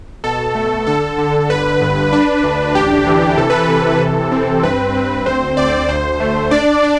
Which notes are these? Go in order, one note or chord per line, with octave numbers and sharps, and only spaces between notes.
B2 A4
A3
D3 A4
D3
G1 B4
G2
D4 B4
D2
A1 G4
E3
C3 A4
B4
A4
C3
E3
C4
G2 B4
C4
D2 C5
D2 D5
D2 C5
A3
D4 D5
D4